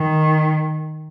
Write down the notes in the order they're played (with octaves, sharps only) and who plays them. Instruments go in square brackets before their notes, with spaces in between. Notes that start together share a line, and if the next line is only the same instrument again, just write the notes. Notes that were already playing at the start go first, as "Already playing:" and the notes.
Already playing: [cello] D#3